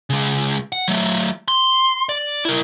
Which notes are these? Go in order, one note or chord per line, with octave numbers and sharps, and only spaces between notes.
C#3 G#3
F#5
F#3 A3
C6
D5
E4 A#4